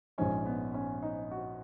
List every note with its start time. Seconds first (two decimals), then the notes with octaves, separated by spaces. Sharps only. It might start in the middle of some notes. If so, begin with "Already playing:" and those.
0.18 A#1 G#2 F3 G#3 C#4
0.46 B3
0.74 C#4
1.03 D#4
1.31 F#4